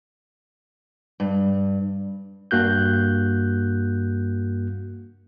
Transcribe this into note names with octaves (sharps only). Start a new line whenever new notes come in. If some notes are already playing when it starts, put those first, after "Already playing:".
G2
G2 A#3 F#4 F#6 G6